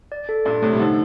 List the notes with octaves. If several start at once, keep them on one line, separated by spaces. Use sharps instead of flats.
D5
A4
G2 A#2 D5
A2 C3 A3
G3
D3 F3 D#4